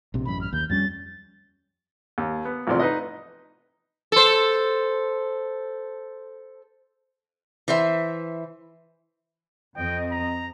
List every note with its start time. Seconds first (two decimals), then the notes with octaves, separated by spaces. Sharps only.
0.14 A#1 C3
0.25 A1 F#2 B5
0.41 F6
0.53 D#2 G6
0.70 F2 G3 C#4 A6
2.18 D#2
2.45 B3
2.67 A1 E2 C3 F3 D5 C6
2.79 D#4 B4 D#5
4.12 A4 C5
7.68 E3 C5 E5
9.77 F2 C4 D#5 G5
10.12 A#5